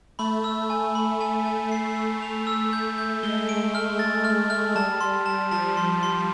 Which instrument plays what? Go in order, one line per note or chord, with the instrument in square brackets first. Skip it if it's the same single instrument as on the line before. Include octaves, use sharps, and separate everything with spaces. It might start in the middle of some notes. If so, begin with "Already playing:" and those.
[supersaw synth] A3 [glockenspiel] B5
[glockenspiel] E6
G#5
B5
G#5
G#5
C7
E6
F7
E6
G6
G6
[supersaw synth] G#3 [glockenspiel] G7
[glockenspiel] D7
F6
A6
F6
F6
[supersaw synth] G3 [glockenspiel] A5
[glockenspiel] C6
A5
[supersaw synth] F3 [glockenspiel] A5
[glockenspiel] C6
C6